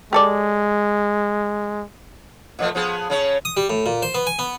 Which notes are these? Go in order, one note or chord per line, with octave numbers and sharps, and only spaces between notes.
G#3 G4 A4 D5
A#2 F3 A3
F3 B3 G#4
C#3 C#4 C#5
D#6
G3
A2
A#2
C5
B3
G#5
B3